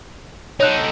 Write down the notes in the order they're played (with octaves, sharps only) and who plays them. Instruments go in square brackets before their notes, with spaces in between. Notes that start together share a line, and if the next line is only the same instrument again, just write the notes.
[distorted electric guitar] D#4 A4 [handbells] C#5 F#6